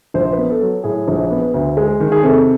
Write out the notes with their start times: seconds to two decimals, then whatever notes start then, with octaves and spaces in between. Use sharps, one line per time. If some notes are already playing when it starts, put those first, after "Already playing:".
0.14 A#1 C5
0.32 B4
0.38 B3
0.50 A4
0.61 F#3
0.84 A2 G#4
1.08 A#1
1.31 B3
1.54 D2
1.77 G#3
2.00 D#3
2.12 G#4
2.23 C3 A4